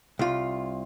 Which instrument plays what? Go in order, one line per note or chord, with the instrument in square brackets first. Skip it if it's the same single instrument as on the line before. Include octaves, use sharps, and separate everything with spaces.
[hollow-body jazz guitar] C2 F4